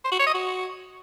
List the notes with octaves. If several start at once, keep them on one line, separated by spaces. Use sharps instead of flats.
C5
F#4
C#5
D#5
F#4